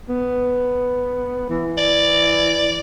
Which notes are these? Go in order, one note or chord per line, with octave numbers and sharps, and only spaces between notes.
B3
E3
D5